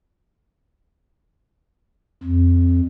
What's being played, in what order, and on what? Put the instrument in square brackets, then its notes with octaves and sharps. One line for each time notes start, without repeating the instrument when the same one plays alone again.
[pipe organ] F2